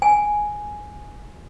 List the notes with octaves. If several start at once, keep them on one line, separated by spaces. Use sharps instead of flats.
G#5